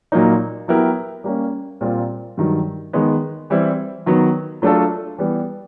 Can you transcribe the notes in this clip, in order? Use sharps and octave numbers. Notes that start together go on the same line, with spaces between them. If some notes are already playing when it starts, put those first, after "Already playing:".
A#2 F#3 A#3 D#4
F#3 B3 E4 G4 A#4
G3 A#3 C#4
A#2 G3 C4 F4 A#4
G2 D#3 F#3
D#3 G#3 B3
E3 G3 C4 E4
D#3 F#3 B3
F#3 A3 D4 F4 A4
E3 G3 B3